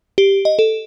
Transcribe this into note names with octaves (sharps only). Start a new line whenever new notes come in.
G4
D#5
A4